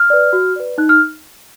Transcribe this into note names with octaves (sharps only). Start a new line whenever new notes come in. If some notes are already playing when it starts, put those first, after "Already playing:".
Already playing: F6
B4 D5
F#4
B4 D5
D#4 F#6
F6